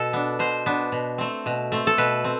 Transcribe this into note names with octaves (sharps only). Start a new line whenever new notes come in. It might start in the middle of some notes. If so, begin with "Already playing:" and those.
Already playing: B2 A4
B3 D4
B2 C5
B3 D4
B2
A3 C4
B2
A3 C4
A4
B2 B4
C4